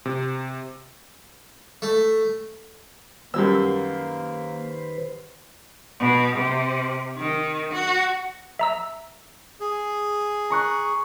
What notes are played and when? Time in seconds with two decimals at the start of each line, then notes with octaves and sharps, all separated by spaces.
0.05 C3
1.82 A3
3.34 F#2 D#3 G3 A#3 B4 C5 E6
6.00 B2
6.37 C3
7.17 D#3
7.73 F#4
8.59 E5 A#5 E6
9.60 G#4
10.50 A#5 C#6 F#6